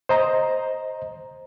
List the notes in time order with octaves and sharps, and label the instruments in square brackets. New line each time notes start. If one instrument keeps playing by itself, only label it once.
[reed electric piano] C5 D#5 A#5